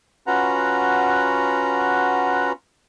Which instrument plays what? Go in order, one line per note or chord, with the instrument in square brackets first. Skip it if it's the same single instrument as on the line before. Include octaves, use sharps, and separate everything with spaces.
[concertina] C#4 F4 F#4 B4 F#5 A#5